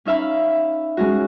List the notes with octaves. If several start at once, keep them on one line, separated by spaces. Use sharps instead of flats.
C#4 D#4 E5 F5 B5
G#3 C#4 F#4